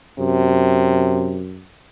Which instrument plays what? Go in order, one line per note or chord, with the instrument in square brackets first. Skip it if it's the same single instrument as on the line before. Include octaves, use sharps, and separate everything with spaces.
[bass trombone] F#2 [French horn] C3